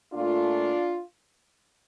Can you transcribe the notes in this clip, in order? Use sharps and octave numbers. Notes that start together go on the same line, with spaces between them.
A#2 A3 D4 F4